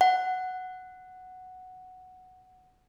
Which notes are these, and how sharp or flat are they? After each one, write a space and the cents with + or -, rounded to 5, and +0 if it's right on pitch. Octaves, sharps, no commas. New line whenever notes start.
F#5 +0